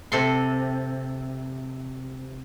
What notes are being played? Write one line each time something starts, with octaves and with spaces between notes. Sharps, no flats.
C3 A4 C6